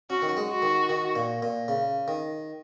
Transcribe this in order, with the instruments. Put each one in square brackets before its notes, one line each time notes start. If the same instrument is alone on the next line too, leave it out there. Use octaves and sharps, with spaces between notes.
[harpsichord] C#4 [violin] F#4
[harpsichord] D#3
F#3
G#3
[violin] F#4
[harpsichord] D#3
D#3
A#2
A#2
C#3
D#3